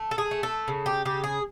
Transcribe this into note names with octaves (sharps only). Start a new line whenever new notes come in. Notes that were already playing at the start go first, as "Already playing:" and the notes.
Already playing: A3
A4
G#4
A3
A4
C#3
G4
C#3 G4
G#4